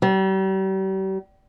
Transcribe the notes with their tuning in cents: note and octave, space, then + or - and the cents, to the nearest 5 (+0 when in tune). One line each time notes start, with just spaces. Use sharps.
G3 -40